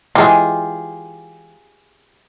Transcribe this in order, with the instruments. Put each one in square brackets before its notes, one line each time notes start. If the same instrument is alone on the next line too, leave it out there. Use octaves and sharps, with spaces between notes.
[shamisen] E3 G#3 [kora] F4 G4 G#4